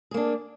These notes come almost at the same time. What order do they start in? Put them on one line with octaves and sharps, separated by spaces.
G#4 A#3 D4